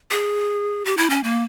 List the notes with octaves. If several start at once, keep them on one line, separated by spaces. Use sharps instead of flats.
G#4
G4
E4
C#4
A#3